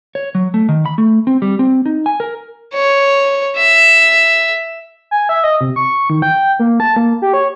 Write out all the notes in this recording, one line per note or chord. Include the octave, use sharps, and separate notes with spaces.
C#5
F#3
A3
D#3
B5
A3
C4
G3
C4
D#4
G#5
A#4
C#5
E5
G#5
E5
D#5
C3
C#6
D#3
G5
A#3
A5
A#3
G4
C#5